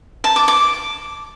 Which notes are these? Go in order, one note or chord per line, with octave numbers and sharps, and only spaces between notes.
A5
D6
D6